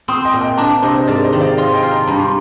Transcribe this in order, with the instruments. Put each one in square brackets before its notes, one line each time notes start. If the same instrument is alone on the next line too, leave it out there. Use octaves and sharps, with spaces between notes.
[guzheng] C4 [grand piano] C6 D#6
[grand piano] D#5 G5
[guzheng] A#2
[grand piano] D#5 G5
[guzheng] D4 [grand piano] A#5 D6
[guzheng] C3 [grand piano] C5 D#5
[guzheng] G#2 [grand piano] A#4 D5
[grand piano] C5 D#5
[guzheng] D#3
[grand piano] D5 F5
[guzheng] F4 [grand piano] C5 D#5
[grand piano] D#5 G5
[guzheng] F4
[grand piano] G5 A#5
[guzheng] G2 [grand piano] A#5
[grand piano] C6